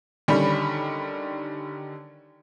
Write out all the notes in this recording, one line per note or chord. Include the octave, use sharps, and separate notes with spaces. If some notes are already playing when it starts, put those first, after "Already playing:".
D3 D#3 G3 C#4 B5